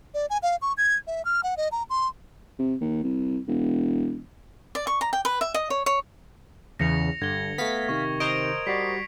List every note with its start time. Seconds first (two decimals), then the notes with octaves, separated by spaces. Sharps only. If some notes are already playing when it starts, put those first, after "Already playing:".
0.14 D5
0.30 G#5
0.43 F5
0.62 C#6
0.77 G#6
1.07 E5
1.25 F6
1.43 F#5
1.57 D#5
1.72 A#5
1.90 C6
2.59 C3
2.80 D#2
3.03 C2
3.47 E1
4.75 D5
4.87 C#6
5.01 A#5
5.13 G5
5.25 B4
5.41 E5
5.54 D#5
5.70 C#5
5.86 C#5
6.79 E2 C#3 A#6 C#7 F7
7.22 G2 D3 G#6 G7
7.58 A3 B3 F5 B6
7.89 C3 D#3 C#6
8.20 A#4 C5 D#5 D7 F7
8.67 G3 F#4 D5 B6 C7